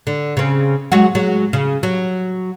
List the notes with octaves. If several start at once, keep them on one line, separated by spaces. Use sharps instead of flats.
D3
C#3 C4
F#3 G#3 F#4
F#3 G#3
C#3
F#3